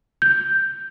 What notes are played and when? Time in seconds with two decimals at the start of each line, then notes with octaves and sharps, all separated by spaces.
0.22 G6